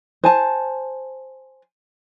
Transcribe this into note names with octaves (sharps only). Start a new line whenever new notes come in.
C5 G#5 A5